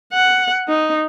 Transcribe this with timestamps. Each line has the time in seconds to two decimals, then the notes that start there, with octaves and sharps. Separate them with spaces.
0.13 F#5
0.69 D#4